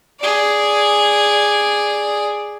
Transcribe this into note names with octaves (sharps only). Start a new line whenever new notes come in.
G#4 D5